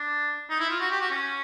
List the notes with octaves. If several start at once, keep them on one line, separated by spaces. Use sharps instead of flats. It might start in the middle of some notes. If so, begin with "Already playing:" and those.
Already playing: D4
D#4
E4
F4
F#4
G4
F#4
C#4